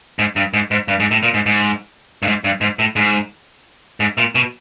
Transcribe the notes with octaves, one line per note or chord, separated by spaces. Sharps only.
G#2
G2
G#2
G#2
G2
G#2
A2
A#2
G#2
G#2
G2
G#2
G2
G#2
A2
G#2
G#2
A#2
B2